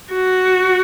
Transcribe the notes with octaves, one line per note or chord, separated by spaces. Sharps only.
F#4